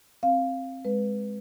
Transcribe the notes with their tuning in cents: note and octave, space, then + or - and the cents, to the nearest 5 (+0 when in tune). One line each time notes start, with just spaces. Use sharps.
C4 +15 F5 +0
G#3 +0 B4 +0